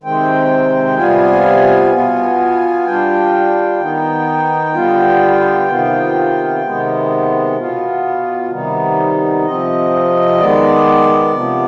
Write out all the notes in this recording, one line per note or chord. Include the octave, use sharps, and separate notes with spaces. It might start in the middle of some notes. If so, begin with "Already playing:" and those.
C3 D#3 G#3 C4 G5
C3 G3 B3 F4 G#5
B2 B3 F4
G3 D4 F4 G5
D#3 B3 D#4
D3 G3 B3 F4
C3 D#3 B3 F4
C3 D#3 G#3 B3
B2 B3 F4
C3 D#3 G3 B3 D#4
C3 F3 C4 D#5
D#3 G#3 B3 D5
C3 F3 B3